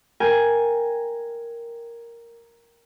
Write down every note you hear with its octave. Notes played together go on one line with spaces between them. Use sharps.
A#4 G5 G#5